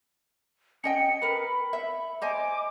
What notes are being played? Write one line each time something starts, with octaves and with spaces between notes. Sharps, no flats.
C#4 D#5 G5 C#7
A#4 B4 B5
E5
C5 D#5 G#5 D6